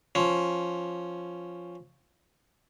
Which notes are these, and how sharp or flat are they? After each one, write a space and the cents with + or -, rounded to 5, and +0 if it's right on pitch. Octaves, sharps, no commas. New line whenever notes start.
F3 +0 C#4 +0